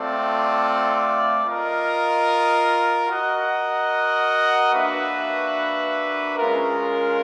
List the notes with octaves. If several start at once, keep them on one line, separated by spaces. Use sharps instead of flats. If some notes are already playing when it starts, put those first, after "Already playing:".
Already playing: A3 C4 F4 A4 D5
F4 A#4 D#5
F#4 A#4 D#5 F#5
A#3 D4 F#4 B4 E5
G#3 C#4 F4 A#4